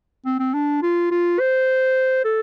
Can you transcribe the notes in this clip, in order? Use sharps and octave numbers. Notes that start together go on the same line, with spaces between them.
C4
C4
D4
F4
F4
C5
A4